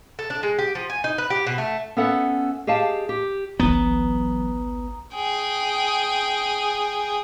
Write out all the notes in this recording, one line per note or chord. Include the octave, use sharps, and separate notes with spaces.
A4
D4
G#3
G4
F3
G#5
D#4
B4
G4
B2
A3
B3 C#4 A4 E5 F#5
G4 G#4 D#5 F5 A5
G4
G#1 C#2 E3 F#3 B3 A#5 D#6 G7
G#4 G5